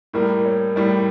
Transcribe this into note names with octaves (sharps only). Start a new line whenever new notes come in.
A2 G3 A#3 A#4
C#5
A2 G3 A#3 D5